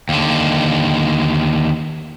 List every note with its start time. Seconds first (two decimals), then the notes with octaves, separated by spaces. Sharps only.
0.09 D#2 D3